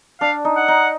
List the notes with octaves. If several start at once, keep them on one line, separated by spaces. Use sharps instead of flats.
D4 F5
D#4
F#5
D#4